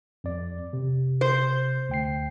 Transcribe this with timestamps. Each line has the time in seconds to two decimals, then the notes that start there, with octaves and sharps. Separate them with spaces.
0.24 F2 D5
0.73 C3
1.21 C5
1.89 D2 G5 C7